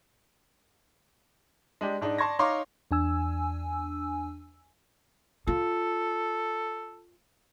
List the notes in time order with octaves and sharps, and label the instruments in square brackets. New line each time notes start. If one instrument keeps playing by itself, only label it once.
[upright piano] G#3 D4 G4
G#2 D4 D#4
D5 A5 C6 C#6 G#6 A#6
D#4 C#5 F5 A#5 C6 D6
[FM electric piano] E2 D4 G#5 E6
[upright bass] F4 [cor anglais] A4